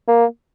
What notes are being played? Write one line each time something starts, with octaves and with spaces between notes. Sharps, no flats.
A#3